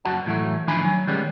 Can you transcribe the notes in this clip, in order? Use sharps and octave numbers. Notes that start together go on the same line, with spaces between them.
F#2 F#4 F#5 A5
A2 E3 F#3 A3
A2 D#3 F3 D4 G#5 B5
F#3
D#3 G3 G#3 B3 C#4